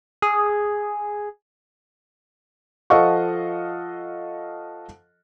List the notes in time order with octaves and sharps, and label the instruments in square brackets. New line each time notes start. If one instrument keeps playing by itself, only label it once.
[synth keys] G#4
[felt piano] F3 A4 D#5 F5 F#5 C#6